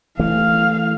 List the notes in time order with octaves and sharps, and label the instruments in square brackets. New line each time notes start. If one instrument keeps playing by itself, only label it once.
[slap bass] E3 A3 [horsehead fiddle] F5